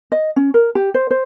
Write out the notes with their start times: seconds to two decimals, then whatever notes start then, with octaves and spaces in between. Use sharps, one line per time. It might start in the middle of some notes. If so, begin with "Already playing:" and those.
0.12 D#5
0.36 C#4
0.54 A#4
0.75 G4
0.94 C5
1.11 C5